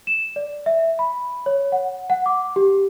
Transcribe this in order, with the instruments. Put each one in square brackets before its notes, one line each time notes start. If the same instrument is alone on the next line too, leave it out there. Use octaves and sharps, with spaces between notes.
[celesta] E7
D5
E5
B5
C#5
F#5
F#5
D6
G4